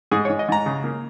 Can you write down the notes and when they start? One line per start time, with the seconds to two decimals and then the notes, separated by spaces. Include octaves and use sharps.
0.11 G#2 G#4
0.25 C#5
0.29 G#2
0.39 D#5
0.48 G#2 A#5
0.66 C#3
0.84 A#3